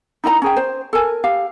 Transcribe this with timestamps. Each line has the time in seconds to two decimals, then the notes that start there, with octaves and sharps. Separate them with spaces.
0.24 D#4 E4 D#5 A#5
0.42 C#4 G#4 G5
0.56 C5
0.93 A4 A#4 G#5
1.24 G4 F5